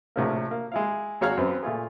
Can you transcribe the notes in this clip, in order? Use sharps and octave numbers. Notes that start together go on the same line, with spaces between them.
A#1 A2 C3 A#3
A#3
G#3 E4 F5
G#1 F#4 C#5 F5 A#5 F6
F#2 B3 C4
A#2 A3 F4 G#4